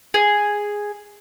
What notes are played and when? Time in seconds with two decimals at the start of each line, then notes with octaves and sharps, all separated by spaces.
0.14 G#4